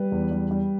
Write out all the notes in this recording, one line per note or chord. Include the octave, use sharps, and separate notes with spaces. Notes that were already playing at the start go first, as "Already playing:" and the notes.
Already playing: G3 B4
E2
G3
G3